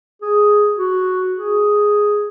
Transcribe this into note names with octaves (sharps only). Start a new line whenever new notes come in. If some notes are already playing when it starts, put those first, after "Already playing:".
G#4
F#4
G#4